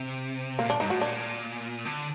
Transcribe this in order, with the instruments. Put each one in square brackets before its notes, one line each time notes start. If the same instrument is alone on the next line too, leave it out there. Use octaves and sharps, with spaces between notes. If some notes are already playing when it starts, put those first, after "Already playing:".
Already playing: [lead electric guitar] C3
[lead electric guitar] A#2 [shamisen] A#3
[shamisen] D4
[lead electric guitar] G2 [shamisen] D#4
[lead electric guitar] A2 [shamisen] F#4
[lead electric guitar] A#2 [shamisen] D4
[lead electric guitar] D3